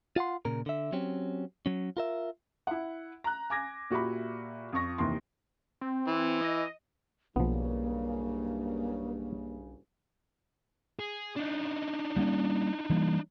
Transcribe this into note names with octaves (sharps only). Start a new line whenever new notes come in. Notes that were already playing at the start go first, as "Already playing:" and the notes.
F4 F5 F#5 C6
A#2 C#3 A#4
D3 E5
F#3 C4 C#4 G4
F#3 C#4
F4 A#4 E5
E4 F#5
A#5 F#6
G#5 D6 G#6 A#6
A#2 F#4 G4 E5 B5
F2 F3 C#6 A#6
D#2 C3 E3 D#4 C6
C4
E3
D#5
F#1 B1 G2 C#3 F3 A#3 B3
G#4
D4 D#4
G3 A#3 C#4
E3 G3 A#3